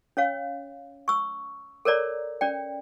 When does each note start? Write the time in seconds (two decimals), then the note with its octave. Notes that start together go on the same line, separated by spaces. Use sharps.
0.17 C#4 C#5 F5
1.08 C#6 E6
1.85 A4 A#4 C#5 D5 A#5
2.41 C#4 D5 G5